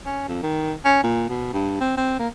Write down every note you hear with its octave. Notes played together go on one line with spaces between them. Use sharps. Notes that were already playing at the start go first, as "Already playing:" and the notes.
C#4
F2
D#3
C#4
A#2
B2
G2
C4
C4
A#3